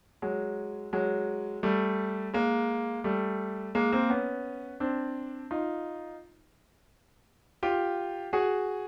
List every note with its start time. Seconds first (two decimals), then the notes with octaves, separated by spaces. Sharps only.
0.22 F#3 G#3
0.93 F#3 G#3
1.63 G3 A3
2.34 G#3 A#3
3.04 G3 A3
3.75 G#3 A#3
3.92 A#3 C4
4.10 B3 C#4
4.80 C4 D4
5.51 D#4 F4
7.63 F4 G4
8.33 F#4 G#4